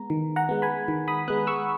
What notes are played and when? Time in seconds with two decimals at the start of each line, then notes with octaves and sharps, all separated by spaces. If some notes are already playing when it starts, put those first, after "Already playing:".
Already playing: G#3 B3 A#5
0.10 D#3
0.36 F#5 A#5
0.49 G#3 B3
0.62 G#5 B5
0.88 D#3
1.08 B5 D#6
1.28 G#3 B3 D#6 F#6
1.47 C#6 E6